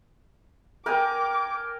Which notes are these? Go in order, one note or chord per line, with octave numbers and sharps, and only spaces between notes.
A#4 G5 G#5 D6